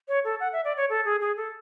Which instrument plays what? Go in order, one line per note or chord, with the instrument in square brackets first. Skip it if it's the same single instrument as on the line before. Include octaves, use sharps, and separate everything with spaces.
[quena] C#5
A4
F#5
E5
D5
C#5
A4
G#4
G#4
A4